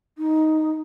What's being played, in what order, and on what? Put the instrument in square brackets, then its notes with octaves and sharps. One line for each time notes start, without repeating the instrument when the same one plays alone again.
[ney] D#4